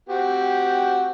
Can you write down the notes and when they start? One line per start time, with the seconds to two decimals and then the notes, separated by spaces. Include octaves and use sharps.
0.09 C4 F#4 G4